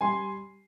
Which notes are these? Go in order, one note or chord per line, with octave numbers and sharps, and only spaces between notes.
G3 G#5 C6